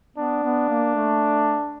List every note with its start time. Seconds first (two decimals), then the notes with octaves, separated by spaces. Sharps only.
0.17 B3 D4
0.43 B3
0.69 A#3
0.95 A3